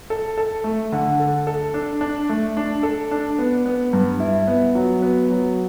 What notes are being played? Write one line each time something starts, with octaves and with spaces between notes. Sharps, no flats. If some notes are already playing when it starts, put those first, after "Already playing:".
A4
A4
A3
D3
A4
A4
D4
D4
A3
D4
A4
D4
B3
B3
G2
E4
B3
F#3
B3
F#3